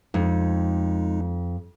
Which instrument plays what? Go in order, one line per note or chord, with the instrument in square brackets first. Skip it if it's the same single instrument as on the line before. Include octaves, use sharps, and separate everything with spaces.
[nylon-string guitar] F2 [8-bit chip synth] G#3 D#4